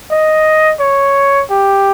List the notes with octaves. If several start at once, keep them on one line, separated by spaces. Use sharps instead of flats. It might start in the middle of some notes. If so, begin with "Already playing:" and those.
D#5
C#5
G4